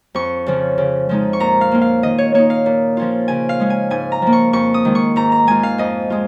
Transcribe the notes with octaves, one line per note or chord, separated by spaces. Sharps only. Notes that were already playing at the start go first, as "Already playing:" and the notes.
F2 C#6
C#3 F3 C#4
C#3
F3 G#3 D#4
C#6
A#2 A#5
F5
A#3 C#4 F4
F5
D#3 D#5
C#5
A#3 D#4 C#5
F5
A#2
F3 C#4 F4
C#3 G#5
F5
G#3 C#4
G#5
G#2 G#5
A#5
F3 A#3
C#6
F2 C#6
D#6
D#3 G#3 F4
C#6
G#2 A#5
A#5
G#3 F4 G#5
F5
F2 D#5
G#3 F4